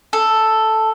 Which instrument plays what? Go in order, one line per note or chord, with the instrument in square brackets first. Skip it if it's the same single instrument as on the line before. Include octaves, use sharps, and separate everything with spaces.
[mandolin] A4